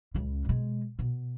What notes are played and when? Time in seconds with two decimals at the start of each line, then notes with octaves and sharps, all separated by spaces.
0.14 C#2 C#3
0.45 B2 G#3
0.99 B2